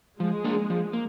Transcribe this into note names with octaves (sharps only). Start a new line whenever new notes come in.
F3 G#3
A#3 D4
F3
A#3